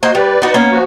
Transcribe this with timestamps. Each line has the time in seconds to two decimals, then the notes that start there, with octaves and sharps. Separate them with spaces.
0.03 A#3 F#4 C5 D#5
0.15 G3 B4 D5
0.42 D#4 F#4
0.54 A#3 B3 C#4
0.71 F3 F#4